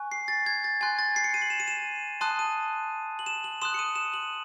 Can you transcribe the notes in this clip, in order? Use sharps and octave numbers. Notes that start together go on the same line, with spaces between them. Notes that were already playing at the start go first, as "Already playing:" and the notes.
Already playing: G#5 C#6 F#6
C7
A6
G#6
A6
G#5 C6 F#6 G#6
A6
C7
C#7
D#7
F#7
E7
D#7
E7
A5 C6 D#6 F#6 D#7
D#7
F#7
E7
F#7
C6 D#6 F#6 E7
C#7
D#7
E7
F#7